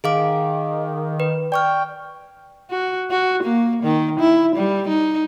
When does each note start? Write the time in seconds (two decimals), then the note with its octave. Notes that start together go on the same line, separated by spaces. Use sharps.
0.04 D#3 G#4 F5 D6
1.20 B4
1.52 D5 G5 C#6 F6
2.70 F#4
3.10 F#4
3.43 A#3
3.84 D#3
4.20 E4
4.56 G3
4.88 D#4